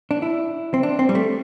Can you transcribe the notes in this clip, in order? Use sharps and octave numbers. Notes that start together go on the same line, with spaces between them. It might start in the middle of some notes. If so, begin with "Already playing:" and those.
D4
E4
C4
D4
C4
G3
A3